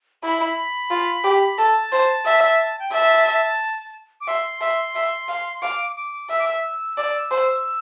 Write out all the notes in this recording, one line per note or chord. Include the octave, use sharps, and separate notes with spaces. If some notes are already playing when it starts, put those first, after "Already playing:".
E4 B5
F4
G4
A4 A5
C5
E5
G5
E5 A5
D6
E5 C6
E5
E5
F5
F5 D6
D6
E5 E6
D6
E6
D5
C5